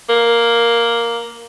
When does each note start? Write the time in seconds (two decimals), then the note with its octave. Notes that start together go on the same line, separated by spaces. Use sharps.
0.09 A#3